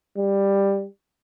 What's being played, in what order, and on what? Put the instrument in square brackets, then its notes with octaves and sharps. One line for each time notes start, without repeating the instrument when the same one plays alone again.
[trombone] G3